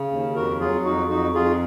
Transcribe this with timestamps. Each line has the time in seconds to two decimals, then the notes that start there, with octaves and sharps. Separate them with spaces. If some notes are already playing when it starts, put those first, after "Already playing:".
Already playing: C#3
0.11 D#2
0.35 F2 F#4 A#4
0.60 F#3 F4 G#4
0.85 F2 D#4 F#4
1.09 F2 D#4 F#4
1.35 F2 F4 G#4